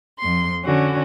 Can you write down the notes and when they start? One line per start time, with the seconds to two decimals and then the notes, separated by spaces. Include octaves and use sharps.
0.19 F2 C6
0.64 D3 C#4 F#4